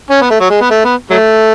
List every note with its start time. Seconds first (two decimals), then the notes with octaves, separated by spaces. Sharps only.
0.10 C#4
0.21 B3
0.30 A3
0.40 F#3
0.50 G#3
0.61 B3
0.70 A3
0.84 B3
1.10 F#3 A3